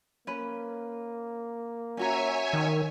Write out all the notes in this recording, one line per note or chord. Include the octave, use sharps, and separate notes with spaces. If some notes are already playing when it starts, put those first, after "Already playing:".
A#3 C#4 B4
C#4 F#4 C#5 E5 G#5 A#5
D#3